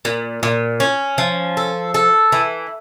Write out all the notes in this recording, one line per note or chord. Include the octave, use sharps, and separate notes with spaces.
A#2
A#2
C#4
F3
A4
A4
E3